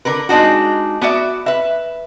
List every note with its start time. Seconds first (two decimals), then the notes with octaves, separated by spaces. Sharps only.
0.05 D3 A#4 B4
0.29 G#3 C4 D4 D#4 F#4
1.01 B3 F#4 D5 E5
1.46 B4 E5